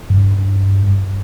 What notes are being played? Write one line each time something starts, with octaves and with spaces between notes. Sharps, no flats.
G2